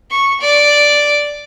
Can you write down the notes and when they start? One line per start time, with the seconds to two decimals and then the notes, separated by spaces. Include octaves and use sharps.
0.11 C#6
0.41 D5